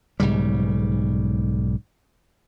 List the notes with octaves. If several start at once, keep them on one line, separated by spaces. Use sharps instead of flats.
B1 G#2 C#3 G3